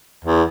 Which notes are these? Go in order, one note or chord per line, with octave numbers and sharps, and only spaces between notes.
E2